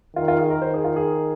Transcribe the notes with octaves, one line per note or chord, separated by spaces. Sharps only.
D#3 F4
F4
G#4
A#4
D#3 C5
G#4
F4
G#4